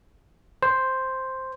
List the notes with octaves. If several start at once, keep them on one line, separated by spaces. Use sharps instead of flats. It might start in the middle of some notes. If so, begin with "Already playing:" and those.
C5